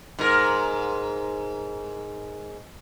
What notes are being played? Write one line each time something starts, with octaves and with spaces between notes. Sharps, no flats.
G#2 A#4